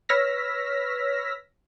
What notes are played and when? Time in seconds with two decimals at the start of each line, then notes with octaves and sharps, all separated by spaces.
0.09 B4 C#5 E6 F6 A#6 B6